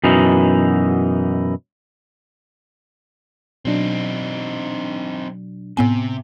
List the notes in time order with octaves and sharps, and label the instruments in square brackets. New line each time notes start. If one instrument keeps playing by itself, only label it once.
[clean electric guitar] F#2 B2 E3 D#4
[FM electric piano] B2 F#3 D4 [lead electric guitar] C4 D#4
[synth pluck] A2 B3 G#5 [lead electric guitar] C3